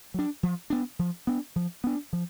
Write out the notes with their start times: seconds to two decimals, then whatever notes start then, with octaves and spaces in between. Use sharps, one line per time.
0.14 F#3 D4
0.43 F3
0.70 B3 D4
0.99 F3
1.27 B3 D4
1.56 F3
1.84 B3 D4
2.13 F3